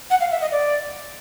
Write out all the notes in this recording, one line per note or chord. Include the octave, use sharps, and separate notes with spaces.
F#5
F5
E5
D#5
D5